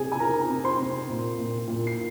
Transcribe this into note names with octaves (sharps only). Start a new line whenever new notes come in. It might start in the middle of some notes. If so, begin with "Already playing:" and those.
Already playing: C3 C4 G4 G#4 G#5
G#5
C4 A#4 A#5
C3
C5 C6
C3
A#2
A#2
A#2
C7